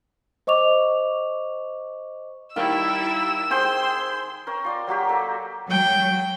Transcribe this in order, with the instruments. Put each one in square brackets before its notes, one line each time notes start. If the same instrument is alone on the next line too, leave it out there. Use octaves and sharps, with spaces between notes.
[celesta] C5 D#5 C#6 D6 F7
[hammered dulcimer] D#3 F5 [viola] G3 E4 [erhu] E6
[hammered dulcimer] G#4 C5 G5 [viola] C6
[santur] A#4 C#5 G5
F4 D5 C6
F#3 A#3 F#4 G4
A#3 A4
[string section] F#3 [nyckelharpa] G5